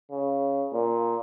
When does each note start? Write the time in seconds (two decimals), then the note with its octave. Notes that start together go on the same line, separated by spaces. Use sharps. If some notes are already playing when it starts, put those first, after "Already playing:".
0.11 C#3
0.73 A#2